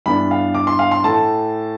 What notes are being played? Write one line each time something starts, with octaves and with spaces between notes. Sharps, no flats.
G2 E3 B3 D4 B5
F5
D6
C6
F5
C6
A2 E3 A3 A5